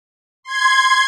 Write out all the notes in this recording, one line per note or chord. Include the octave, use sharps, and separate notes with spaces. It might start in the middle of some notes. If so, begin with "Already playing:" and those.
C6 G#6